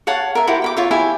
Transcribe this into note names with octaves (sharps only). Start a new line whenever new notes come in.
C#5 F5 F#5 A5
A#4 E5
E4 F#4 G4 C5
G5 B5 D6
F4 C#5 E5
E4 G4 E5 G#5